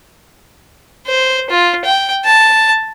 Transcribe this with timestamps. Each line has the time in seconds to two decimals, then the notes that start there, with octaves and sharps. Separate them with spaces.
1.07 C5
1.50 F4
1.85 G5
2.25 A5